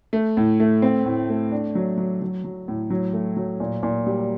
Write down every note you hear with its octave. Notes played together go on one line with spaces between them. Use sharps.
A3
A2
A3
C4
A2
A3
D4
F#3
F#3
F#3
F#3
A2
F#3
A3
F#3
A#2
A#2
G3